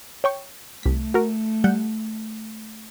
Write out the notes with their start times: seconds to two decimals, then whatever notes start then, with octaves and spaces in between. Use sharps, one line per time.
0.24 C#5 G5 C#6
0.83 C2 A3 B6
1.14 F#4 A#4
1.64 G3 F#5 G6